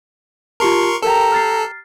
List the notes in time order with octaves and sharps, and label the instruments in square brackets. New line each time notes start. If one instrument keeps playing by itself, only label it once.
[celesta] F4 G4 A5 [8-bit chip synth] A#4 C6 C#6
[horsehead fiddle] G4 A#5 [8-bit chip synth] A4 [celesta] A#4 G5
[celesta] F6 A6 C7